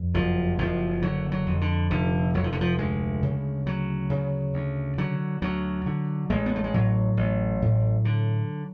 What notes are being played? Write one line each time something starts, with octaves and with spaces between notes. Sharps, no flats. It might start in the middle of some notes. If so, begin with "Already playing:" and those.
Already playing: F2
F#1 F3
F#1 F3
D3 F#3
F#3
F2
D3
F1 D3
F1 F#3
F3
D3
F3
D2 G#3
C#3
D2 F#3
C#3
D2
D3 F#3
D2 F#3
D3
A1 G#3
B3
A3
G#3
A2 F#3
A1
A2
D3